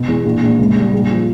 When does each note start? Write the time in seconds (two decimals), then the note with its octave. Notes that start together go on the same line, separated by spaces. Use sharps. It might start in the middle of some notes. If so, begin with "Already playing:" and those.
Already playing: B2
0.08 E2
0.25 A#1
0.42 A#1
0.59 C#2
0.76 G3
0.93 A#1
1.10 F3